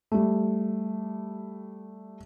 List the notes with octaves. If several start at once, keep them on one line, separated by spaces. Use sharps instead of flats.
G3 A3